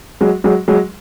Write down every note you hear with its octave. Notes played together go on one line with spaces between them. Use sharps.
F#3 G#3
F#3 G#3
F#3 G#3